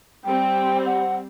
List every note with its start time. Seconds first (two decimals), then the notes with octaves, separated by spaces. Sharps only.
0.24 G3 C4 G5
0.86 F#5